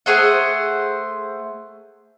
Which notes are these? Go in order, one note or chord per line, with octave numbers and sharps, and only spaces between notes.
A3 G#4 C5 F#5